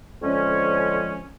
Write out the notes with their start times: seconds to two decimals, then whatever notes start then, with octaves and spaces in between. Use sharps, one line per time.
0.20 F2 D3 F3 G#3 C#4